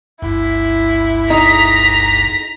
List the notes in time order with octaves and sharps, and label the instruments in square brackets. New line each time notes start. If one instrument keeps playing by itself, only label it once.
[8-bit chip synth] G1 C#2 G2 [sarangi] E4
[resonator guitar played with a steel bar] D#4 [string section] A#5 B6